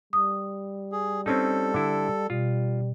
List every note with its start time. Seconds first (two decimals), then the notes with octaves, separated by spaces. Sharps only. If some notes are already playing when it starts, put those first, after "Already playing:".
0.13 G3 D#6
0.92 G#4
1.26 C4 C#4 D#4 A4
1.74 D3 E4
2.30 B2 G3 F4